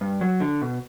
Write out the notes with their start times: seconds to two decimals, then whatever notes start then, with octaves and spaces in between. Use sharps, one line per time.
0.01 G2
0.21 F#3
0.40 D3
0.62 B2